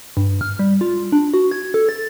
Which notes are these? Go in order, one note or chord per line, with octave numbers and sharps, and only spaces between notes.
G2
F6
G3
F4
D4
F#4
G#6
A4
A6